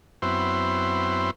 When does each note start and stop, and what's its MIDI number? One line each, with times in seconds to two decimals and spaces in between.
0.22 1.31 42
0.22 1.31 59
0.22 1.31 60
0.22 1.31 64
0.22 1.31 72